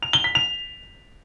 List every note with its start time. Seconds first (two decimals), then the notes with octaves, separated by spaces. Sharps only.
0.03 F7
0.13 G7
0.24 B6
0.35 F7